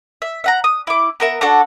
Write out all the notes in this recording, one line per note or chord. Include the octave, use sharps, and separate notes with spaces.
E5
E5 F#5 A#5
D#6
E4 D6
B3 A#4 E5
D4 F#4 A4 F#5